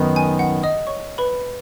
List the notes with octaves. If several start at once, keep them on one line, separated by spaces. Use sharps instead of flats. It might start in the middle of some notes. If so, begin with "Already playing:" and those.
Already playing: F#2 D#3 B3 D#4
G#5
F#5
D#5 D#6
C#5 C#6
B4 B5